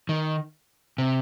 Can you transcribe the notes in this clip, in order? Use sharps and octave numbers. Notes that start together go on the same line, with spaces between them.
D#3
C3